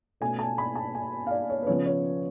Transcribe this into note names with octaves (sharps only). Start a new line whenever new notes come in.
B2 A3 C#4 G#5
A5
B5
A5
G#5
F5
D5
C#5
B4
C#3 F3 B3 C#5
C#5